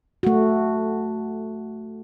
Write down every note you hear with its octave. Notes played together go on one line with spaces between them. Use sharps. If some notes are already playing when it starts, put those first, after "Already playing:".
A3 F#4